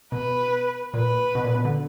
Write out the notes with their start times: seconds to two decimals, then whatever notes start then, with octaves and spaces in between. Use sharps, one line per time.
0.12 B2 B4
0.94 A#2 B4
1.35 B2
1.44 A#2
1.55 B2
1.65 D3